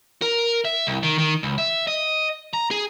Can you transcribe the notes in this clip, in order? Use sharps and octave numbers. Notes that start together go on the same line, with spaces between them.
A#4
E5
C2
D#3
D#3
C#2
E5
D#5
A#5
G#4